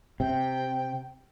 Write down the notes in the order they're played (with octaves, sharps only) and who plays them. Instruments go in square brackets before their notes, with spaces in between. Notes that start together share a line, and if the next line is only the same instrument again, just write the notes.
[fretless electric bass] C3 [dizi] G5